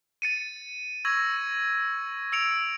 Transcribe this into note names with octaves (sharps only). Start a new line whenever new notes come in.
A6 C#7 D#7
C#6 E6 G#6 A#6
E6 C#7 D7 F7